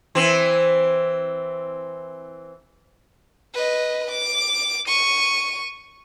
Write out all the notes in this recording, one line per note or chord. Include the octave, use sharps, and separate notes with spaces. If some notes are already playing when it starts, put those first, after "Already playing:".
E3 C4
B4 D#5
D6
C#6 D#7